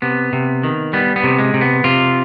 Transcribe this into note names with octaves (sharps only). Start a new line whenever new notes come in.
C3 B3
C3
D#3
G3 B3
B3
C3
G#3
C3
B3
C3 F4